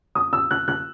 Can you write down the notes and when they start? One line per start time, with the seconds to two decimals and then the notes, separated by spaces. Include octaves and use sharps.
0.15 D#6
0.33 E6
0.51 F#6
0.68 F#6